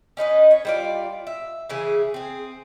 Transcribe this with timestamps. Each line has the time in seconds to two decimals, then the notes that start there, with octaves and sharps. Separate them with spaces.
0.17 C#4 D#4 B4 D#5
0.51 C#5
0.65 G3 F4 D5
1.27 E5
1.69 C#3 E3 G#4
2.14 C4 G#4